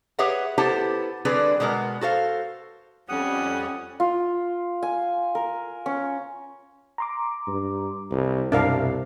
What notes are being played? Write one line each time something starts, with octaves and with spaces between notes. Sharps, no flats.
G4 G#4 B4 C#5 E5 F#5
B3 E4 G4 A4 C5 A5
D3 G3 C4 D4 G#4 B4
B2 G#3 B3 A#4
F#4 A4 C5 F5
F2 G3 C#4 F#5 D#6
F4
G#5
A#4
C#4
A#5 C6 D6
G2
C2
C2 F#2 B2 D4 A#4 E5 F5